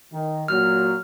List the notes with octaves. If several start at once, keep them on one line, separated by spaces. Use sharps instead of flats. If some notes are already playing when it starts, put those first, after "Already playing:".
D#3
A#2 F#3 F6